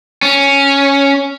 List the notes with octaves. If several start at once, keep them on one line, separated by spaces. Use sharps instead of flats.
C#4